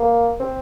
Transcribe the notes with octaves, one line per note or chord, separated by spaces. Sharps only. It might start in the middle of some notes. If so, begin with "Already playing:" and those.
Already playing: A#3
C4